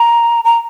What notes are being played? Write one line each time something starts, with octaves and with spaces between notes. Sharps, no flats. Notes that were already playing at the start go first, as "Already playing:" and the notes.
Already playing: A#5
A#5